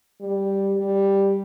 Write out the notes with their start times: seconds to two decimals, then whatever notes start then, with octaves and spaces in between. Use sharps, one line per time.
0.20 G3
0.76 G3